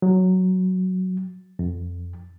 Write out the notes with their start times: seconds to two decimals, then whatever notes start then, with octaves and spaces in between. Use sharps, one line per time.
0.02 F#3
1.59 F2